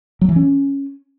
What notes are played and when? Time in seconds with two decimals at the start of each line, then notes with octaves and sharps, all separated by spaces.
0.21 F#3
0.29 E3
0.36 C#4